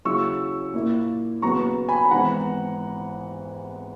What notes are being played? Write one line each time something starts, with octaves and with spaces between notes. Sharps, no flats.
D#2 C#3 F#3 C#4 E4 C#6 E6
A#2 A#3 E4
D#2 C#3 F#3 B3 A#5 C#6
G#5 B5
B5
G#1 G#2 E3 B3 E4 F#5 A#5